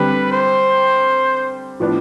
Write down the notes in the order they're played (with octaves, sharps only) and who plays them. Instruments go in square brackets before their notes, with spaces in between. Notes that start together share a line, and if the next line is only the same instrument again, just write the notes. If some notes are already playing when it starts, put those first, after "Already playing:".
Already playing: [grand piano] D3 G3 C4 G4 [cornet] B4
[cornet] C5
[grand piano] A2 F3 B3 D4